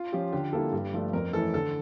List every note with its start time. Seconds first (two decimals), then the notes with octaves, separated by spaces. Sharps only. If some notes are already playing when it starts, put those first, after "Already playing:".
Already playing: F4
0.12 F3 C#4 G4
0.32 D3 G4
0.53 G3 A#3 E4 A4
0.72 G2
0.94 F3 A3 D4 A4
1.13 F2 A#4
1.33 E3 A3 C#4 E4 A4
1.54 D3 A4